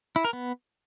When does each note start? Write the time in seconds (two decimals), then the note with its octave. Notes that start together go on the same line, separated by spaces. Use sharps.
0.16 E4
0.25 A#4
0.33 B3